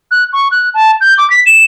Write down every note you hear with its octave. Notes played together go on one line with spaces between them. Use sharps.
F#6
C#6
F#6
A5
G6
D6
B6
E7